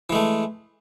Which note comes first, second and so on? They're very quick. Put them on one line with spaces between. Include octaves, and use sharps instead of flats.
E3 G#3 A3